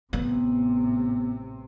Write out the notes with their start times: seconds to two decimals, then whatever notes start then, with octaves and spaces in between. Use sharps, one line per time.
0.13 A1 C3 B3